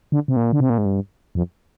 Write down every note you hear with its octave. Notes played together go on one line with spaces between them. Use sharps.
D3
C3
A#2
D3
C3
A#2
G#2
G2
F2